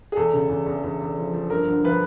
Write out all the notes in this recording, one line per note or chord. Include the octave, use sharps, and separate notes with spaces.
G#4
E2 A4
C#3
E2
E2
E2
E2
F3
F3
G2 A#4
D3
F3 B4